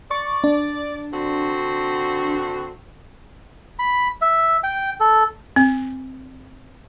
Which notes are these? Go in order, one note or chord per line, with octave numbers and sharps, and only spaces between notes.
D5 C#6
D4
D3 C4 F#4
B5
E5
G5
A4
C4